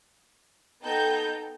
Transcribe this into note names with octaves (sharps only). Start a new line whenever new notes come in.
B3 D#4 A4 G5 A#5 G6